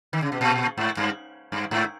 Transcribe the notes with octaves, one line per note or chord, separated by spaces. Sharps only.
D#3
C#3
B2
A#2
G#2
G2
G2
G#2